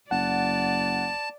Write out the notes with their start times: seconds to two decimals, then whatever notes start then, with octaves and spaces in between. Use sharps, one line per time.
0.11 F#1 D5 F#5 A5